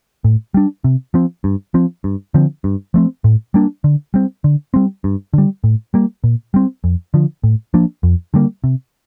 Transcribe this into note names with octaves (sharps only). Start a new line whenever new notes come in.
A2
G3 D4
C3
F3 C4
G2
F3 C4
G2
D3 F3 C4
G2
F3 A3 C4
A2
G3 A#3 D4
D3
G3 C4
D3
G3 C4
G2
D3 G3
A2
G3 A#3
A#2
G3 C4
F2
D3 F3
A2
F3 A#3 D4
F2
D3 G3 A#3
C3